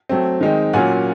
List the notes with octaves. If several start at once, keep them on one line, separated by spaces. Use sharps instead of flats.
F#3 A3 C4
D#3 G#3 C4 D#4
A#2 F#3 A#3 C#4 F4 F#5 G#5